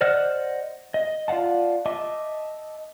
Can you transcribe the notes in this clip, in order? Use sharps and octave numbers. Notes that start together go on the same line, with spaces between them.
C5 D5 D#5 F#5 F6
D#5
F4 D5 F5 F#5 A5
D#5 E5 A5 D6